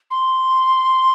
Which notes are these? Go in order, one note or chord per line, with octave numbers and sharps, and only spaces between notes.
C6